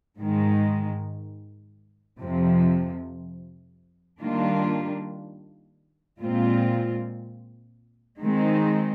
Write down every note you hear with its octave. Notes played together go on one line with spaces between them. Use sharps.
G#2 D#3 G#3
F2 C3 F3
D#3 G3 A#3 D4 F4
A#2 G#3 C4 F4
D#3 G#3 C4 D#4